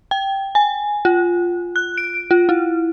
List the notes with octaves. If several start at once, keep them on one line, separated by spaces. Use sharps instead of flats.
G5
G#5
F4
F#6
D7
F4
E4